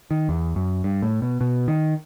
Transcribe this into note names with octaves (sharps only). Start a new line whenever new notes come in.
D#3
E2
F#2
G2
A2
B2
B2
D#3